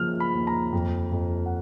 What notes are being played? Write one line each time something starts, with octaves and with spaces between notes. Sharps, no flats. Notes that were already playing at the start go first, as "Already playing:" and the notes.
Already playing: C#3 F3 A#3 F6
B5
D#2
A#5
F2
F2
F#5